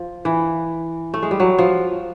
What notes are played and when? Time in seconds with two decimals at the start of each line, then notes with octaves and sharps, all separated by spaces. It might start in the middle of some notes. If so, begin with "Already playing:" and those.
Already playing: F3
0.25 E3
1.14 A3
1.22 G#3
1.31 G3
1.40 F#3
1.58 F3